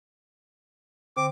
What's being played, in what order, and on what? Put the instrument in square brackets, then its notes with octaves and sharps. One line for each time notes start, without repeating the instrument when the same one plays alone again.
[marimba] D3 [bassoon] C4 [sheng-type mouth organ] D6